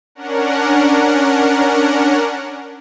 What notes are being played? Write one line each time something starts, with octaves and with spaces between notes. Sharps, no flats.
C#4 D4 A#4 F#5